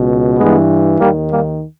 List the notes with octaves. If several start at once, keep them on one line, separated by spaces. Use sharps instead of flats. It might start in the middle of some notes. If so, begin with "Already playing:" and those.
Already playing: C#2 B2
G2 E3 G#3 B3
D#2 D#3 G3 A#3
G3 A#3